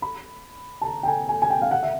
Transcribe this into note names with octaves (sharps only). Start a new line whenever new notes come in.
B5
A5
A#5
G5
G#5
G#5
G#5
G5
F5
F#5
E5